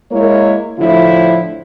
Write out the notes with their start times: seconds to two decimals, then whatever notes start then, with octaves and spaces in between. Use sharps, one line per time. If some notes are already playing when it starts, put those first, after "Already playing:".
0.12 G#3 A#3 E4 A#4 C#5
0.79 A2 D3 F3 E4